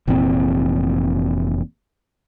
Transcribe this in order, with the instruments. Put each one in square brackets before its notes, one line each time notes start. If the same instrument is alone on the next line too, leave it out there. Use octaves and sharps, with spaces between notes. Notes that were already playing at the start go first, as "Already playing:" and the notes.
[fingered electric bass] F1 A#2 E3 C4